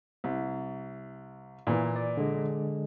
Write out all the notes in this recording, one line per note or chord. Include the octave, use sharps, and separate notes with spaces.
C2
A#2 E3
D5
D3 G#3